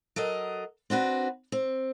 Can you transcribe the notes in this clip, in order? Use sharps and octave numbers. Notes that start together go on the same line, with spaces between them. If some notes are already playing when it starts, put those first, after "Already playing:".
F#3 A4 A#4 D#5
C4 D4 F#4 B4
C4